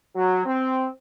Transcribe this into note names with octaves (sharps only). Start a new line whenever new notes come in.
F#3
C4